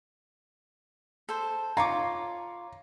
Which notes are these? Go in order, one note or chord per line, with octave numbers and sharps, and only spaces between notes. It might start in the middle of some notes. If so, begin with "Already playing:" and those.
A4 C5
F4 C#5 A#5 D6